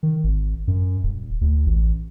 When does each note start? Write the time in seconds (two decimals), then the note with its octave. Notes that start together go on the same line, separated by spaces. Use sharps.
0.03 D#3
0.24 G#1
0.68 F#2
1.03 D#1
1.41 D2
1.66 A1